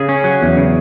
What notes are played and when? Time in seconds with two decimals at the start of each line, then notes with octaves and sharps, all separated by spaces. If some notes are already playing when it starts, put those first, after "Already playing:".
Already playing: C#3 G#4 G#5
0.09 C#4
0.24 F#3
0.41 E2
0.57 C#3